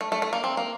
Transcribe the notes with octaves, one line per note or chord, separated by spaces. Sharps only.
A3
A3
A3
A#3
C4
A#3